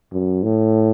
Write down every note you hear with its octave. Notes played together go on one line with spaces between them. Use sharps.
F#2
A2